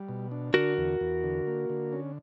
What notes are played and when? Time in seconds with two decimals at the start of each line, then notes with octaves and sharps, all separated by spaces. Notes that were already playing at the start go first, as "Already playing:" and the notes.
Already playing: G3
0.09 B2
0.31 D4
0.54 D3 F#4 A#4
0.78 E2
1.01 E2
1.24 D3
1.47 A#3
1.70 D3
1.93 C#4